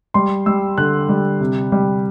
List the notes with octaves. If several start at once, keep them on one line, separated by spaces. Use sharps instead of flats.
G3 C6
G3 E6
D3 F#6
G3
C3
G3